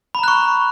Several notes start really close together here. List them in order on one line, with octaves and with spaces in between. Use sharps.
B5 A#5 F#6 C#6